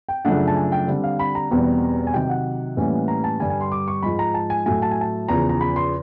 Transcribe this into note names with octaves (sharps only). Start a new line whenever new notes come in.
G5
F#2 C#3 F3 A3 D4 F#5
A5
G#5
G5
D3 G3 C4
F5
B5
A#5
E2 B2 G3 C4
G#5
C3 D#3 F#3 G5
F#5
A2 E3 G3 A#3 C#4
A#5
A5
G2 D3 G3 G#5
G#5
C6
D6
C#6
G#2 F3 G#3 B5
A#5
A5
G#5
A2 F#3 A3 G#5
A5
G#5
A5
E2 C#3 F3 A#5
A#5
B5
C6